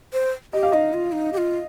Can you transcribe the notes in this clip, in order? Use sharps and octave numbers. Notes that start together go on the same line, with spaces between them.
C5
G4 D#5
F5
D#4 D#5
F4
D#4
G4
F4